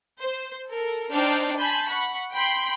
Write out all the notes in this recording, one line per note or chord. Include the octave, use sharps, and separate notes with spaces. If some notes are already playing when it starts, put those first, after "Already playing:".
C5
A4 A#4
D4 D#4 C5 G5 F6 C7
G#5 A5 B5 C6 G6
F#5 B5 C#6
G5 B5 C6